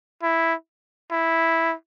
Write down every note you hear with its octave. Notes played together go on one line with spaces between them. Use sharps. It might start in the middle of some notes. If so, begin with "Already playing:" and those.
E4
E4